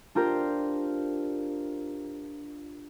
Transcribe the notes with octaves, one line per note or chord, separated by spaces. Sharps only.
D4 F4 G4 A#4 C5